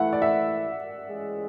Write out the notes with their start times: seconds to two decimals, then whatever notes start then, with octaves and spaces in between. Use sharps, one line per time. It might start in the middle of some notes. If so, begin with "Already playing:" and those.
Already playing: E3 A3 E4 F#5
0.13 D5
0.22 E5
1.08 E3 G#3 C#4 G#4